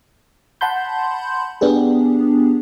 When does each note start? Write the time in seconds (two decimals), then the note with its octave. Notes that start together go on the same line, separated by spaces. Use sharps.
0.61 F#5 A5 B5 C6 G6
1.61 B3 D4 G4 G#4